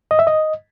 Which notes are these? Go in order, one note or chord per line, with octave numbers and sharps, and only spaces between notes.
D#5
E5
D#5